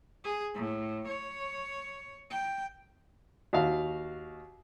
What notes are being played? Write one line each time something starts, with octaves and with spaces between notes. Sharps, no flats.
G#4
A2
C#5
G5
D#2 F#4 F5